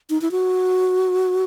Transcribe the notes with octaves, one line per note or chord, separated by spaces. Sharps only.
D#4
E4
F#4